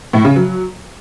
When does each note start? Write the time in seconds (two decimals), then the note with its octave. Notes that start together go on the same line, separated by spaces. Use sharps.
0.13 A2
0.25 C#3
0.36 F#3